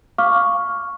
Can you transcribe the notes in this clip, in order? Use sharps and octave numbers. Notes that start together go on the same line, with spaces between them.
F5 C#6 D6 F6